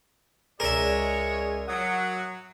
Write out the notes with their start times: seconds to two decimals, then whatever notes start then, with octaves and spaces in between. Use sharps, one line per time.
0.60 C#2 G#3 G#4 A#4 C#5 D5 E5
1.68 F#3 D#6